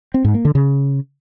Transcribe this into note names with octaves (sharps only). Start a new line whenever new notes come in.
C4
G#2
A#3
D3
C#3